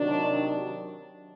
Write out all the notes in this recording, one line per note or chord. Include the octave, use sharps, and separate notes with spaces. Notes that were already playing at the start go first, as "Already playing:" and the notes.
Already playing: C3 D#3 F#3 D4